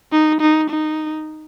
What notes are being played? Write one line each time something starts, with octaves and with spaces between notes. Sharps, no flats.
D#4
D#4
D#4